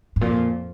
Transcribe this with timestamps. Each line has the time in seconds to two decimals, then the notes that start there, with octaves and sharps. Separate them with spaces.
0.16 G#2
0.21 F2 A#2 F3